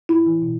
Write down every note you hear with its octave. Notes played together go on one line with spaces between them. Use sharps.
A2 E4
E3
B2